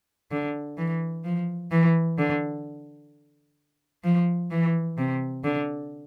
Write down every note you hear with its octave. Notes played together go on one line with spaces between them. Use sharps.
D3
E3
F3
E3
D3
F3
E3
C3
D3